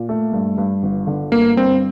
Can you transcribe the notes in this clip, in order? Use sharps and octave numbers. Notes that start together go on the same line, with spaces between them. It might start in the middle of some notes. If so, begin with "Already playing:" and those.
Already playing: A#2
A3
G2
G2
G1
D3
G1 A#3
G2 C4